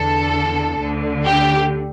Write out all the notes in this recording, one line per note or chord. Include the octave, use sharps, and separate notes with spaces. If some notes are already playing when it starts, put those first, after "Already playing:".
Already playing: E2 D3 A4
D2 D3
G4